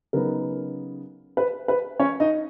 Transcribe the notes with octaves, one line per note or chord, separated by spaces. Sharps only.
C#3 F#3 B3 D#4 A#4
B4
B4
C#4 C#5
D#4 D#5